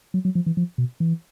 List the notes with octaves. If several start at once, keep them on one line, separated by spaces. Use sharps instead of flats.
F#3
F#3
F3
E3
F3
B2
E3